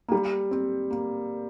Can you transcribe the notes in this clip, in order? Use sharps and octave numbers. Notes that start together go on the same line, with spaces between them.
A#3
G3
C4
A#3